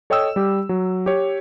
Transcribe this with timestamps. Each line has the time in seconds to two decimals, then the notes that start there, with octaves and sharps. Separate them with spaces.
0.10 A4 C#5 D#5 G5 D#6 E6
0.36 G3 G4
0.69 F#3
1.06 G4 C#5